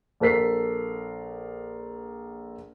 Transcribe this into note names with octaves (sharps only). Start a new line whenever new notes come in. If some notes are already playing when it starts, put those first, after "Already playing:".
A#1 A4 A#4 B6 C7